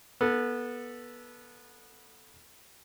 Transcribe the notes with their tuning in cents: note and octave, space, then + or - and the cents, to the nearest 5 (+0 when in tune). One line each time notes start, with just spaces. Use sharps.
B3 -20 A4 +0